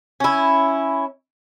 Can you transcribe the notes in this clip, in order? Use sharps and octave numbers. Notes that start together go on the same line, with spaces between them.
C#4 E4